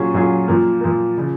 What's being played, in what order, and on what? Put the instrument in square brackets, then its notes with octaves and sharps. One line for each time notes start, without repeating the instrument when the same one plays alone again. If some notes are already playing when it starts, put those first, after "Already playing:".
Already playing: [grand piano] A#2 F#3 C#4 F4 G#4
A#2 F#3 C#4 F4 G#4
A#2 F3 A#3
A#2 F3 A#3
C#3 F3